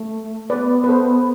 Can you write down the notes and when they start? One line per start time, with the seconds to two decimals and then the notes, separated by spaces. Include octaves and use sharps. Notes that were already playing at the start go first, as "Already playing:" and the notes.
Already playing: A3
0.50 B3 B4 D5
0.84 B4
0.88 A4 C5